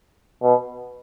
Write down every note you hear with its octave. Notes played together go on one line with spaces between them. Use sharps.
B2